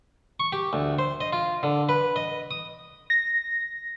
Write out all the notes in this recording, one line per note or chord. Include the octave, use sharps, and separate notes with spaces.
C#6
G4
D2
C5
D#5
F4
D3
B4
D#5
D#6
A#6